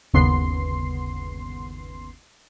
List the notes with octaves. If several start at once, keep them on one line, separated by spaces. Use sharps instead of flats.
G1 D#2 C#3 B3 C6 C7